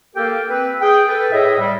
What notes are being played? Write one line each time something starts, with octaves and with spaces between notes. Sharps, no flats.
A#3 G4 A4 A#4 F5 G5
C4 B4
G#4 G5
A4 B4
A2 G#4 D#5 E5
G3